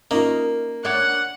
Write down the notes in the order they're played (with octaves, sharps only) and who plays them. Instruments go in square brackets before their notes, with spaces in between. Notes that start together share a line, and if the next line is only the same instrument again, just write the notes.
[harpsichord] A#3 [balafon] C#4 D#4 F4 [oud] A#4 D#5
[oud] D4 C#5 D5 [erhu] F#5